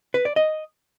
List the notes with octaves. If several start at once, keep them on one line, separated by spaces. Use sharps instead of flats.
B4
D5
D#5